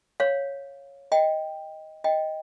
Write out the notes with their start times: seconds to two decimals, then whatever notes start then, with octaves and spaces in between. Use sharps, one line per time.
0.20 C#5 F5
1.12 D#5 G5
2.04 D#5 G5